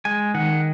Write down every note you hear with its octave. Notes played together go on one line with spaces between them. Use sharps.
G#3 G#5
D#3 F#5